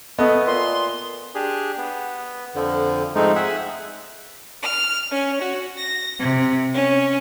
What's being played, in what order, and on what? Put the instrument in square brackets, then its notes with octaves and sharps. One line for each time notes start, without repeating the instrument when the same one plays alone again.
[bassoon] A3 [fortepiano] B3 [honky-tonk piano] D#5
[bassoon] A#2 [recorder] C6
[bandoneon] D4 G4 G#4
B3
F2 D3 F3
G#2 F3 G#3 A3 C4 D#4
G#4 E5 F#5
[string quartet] F6
C#4
F#4
A#6
C3
C#4